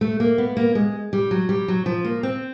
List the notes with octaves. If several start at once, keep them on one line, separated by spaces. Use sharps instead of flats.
A3
A#3
B3
A#3
G#3
G3
F#3
G3
F#3
F3
A#3
C4